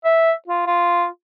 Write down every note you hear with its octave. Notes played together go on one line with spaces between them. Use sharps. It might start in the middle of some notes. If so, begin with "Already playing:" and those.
E5
F4
F4